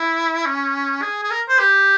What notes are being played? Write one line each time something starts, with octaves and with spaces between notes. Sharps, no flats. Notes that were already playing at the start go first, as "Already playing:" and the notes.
Already playing: E4
C#4
G#4
G#4
A#4
C5
G4